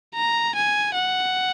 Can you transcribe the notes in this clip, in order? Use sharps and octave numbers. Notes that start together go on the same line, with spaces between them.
A#5
G#5
F#5